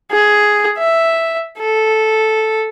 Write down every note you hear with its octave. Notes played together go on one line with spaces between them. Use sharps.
G#4
E5
A4